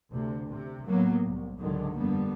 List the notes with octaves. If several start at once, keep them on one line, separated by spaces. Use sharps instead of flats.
D2 C3
C3
A2 F#3 A#3 B3
C2
C#2 G#2 D3 D#3 F#3 G#3
F1 G2 D3 G3 A#3 B3